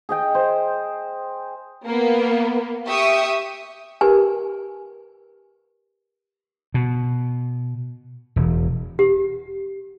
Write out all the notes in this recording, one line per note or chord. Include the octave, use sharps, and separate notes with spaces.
G#4 D#5 G5
C5
A#3 B3
G4 E5 C#6 D#6
G4 A#4 B4 G#5
B2
E1
G4